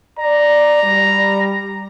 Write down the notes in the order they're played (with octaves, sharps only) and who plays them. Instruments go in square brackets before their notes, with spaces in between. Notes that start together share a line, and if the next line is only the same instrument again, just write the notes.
[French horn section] D5 [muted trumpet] A#5
[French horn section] G3